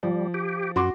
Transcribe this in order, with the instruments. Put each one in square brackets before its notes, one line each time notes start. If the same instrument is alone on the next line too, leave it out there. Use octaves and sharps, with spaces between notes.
[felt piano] F3 [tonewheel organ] G3
[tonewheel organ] G4
[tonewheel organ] F#2 [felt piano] F#4 C6 D6